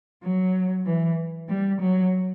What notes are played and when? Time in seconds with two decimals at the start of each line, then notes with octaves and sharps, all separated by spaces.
0.23 F#3
0.86 E3
1.49 G3
1.80 F#3